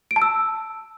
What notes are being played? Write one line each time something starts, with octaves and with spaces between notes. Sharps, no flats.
D7
A5
E6